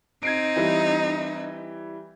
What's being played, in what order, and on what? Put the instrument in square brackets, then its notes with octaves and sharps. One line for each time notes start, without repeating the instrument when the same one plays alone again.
[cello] C4 D#4 [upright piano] G#6 C7 D7
[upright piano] E3 G3